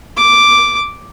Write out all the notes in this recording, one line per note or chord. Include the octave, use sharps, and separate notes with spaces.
D6